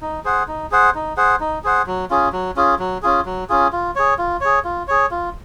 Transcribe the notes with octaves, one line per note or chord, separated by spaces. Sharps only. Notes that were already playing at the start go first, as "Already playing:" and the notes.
D#4
G#4 C5 F#5
D#4
G#4 C5 F#5
D#4
G#4 C5 F#5
D#4
G#4 C5 F#5
F#3
C#4 F4 G#4
F#3
C#4 F4 G#4
F#3
C#4 F4 G#4
F#3
C#4 F4 G#4
F4
G#4 C#5
F4
G#4 C#5
F4
G#4 C#5
F4